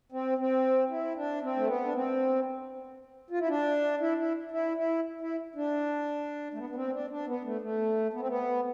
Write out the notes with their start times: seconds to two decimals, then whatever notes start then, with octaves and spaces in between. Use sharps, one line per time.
0.12 C4
0.38 C4
0.90 E4
1.16 D4
1.42 C4
1.56 A3
1.67 B3
1.85 D4
1.94 C4
3.30 F4
3.40 E4
3.49 D4
4.00 E4
4.17 E4
4.51 E4
4.77 E4
5.21 E4
5.55 D4
6.54 A3
6.58 B3
6.70 B3
6.75 C4
6.92 D4
7.10 D4
7.27 B3
7.44 A3
7.61 A3
8.13 B3
8.20 C4
8.28 B3